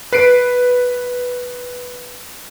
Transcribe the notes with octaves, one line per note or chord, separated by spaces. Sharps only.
B4 C7 D7